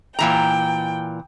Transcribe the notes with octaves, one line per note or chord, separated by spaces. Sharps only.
A#2 E3 G5 A#5